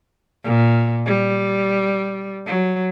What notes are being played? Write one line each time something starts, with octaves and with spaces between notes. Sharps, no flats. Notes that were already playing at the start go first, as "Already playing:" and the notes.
A#2
G3
F#3